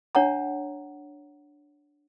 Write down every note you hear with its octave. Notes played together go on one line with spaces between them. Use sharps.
D4 C#5 F#5 A#5